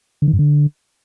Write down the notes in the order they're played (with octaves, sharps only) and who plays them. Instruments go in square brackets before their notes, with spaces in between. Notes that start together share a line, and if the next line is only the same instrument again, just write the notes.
[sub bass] D3
D#3
G2
D3